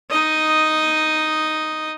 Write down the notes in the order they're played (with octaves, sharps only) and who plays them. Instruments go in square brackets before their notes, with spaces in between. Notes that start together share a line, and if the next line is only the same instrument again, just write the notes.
[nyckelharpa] D#4 D#5